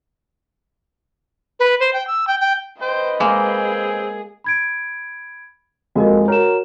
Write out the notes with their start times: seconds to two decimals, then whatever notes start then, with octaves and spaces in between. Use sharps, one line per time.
1.60 B4
1.80 C5
1.93 G5
2.07 E6
2.28 G5
2.40 G5
2.81 B4 C5 D#5 G5
3.20 G#3 A#3 C4 G#4
4.44 B5 G#6 D7
5.96 F2 G#3 A#3 F#4 A#4 D#5
6.28 F#4 A#4 C#5 E7